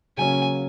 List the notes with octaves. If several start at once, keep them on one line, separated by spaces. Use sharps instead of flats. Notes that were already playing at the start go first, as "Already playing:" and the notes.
C#3 F#3 A#3 C#4 G#5